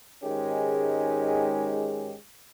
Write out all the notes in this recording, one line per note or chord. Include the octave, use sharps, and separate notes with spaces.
G#2 D#3 G#3 C#4 G4 G#4